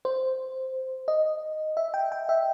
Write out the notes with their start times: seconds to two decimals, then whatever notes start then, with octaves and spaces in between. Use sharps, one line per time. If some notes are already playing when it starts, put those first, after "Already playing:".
0.05 C5
1.08 D#5
1.77 E5
1.94 G5
2.12 G5
2.29 E5